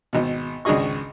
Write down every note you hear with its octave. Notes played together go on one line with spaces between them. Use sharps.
G#1 B2
G#1 C#2 D4 G#4 D#5 C#6